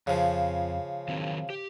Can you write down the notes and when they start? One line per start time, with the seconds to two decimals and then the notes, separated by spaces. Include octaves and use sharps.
0.07 F2 C#3 F3
1.08 D#3 F#3 C4
1.50 G4